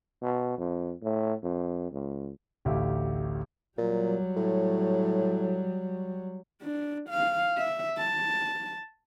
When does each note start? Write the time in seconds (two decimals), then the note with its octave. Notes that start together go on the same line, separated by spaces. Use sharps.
0.22 B2
0.58 F2
1.02 A2
1.43 F2
1.92 C#2
2.65 A1 D2 G4 E5 F5
3.78 A#2 F#3 G3
4.36 A2
6.62 D4
7.09 F5
7.57 E5
7.98 A5